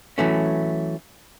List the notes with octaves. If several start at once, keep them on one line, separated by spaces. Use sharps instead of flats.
E3 F#3 A3 C#4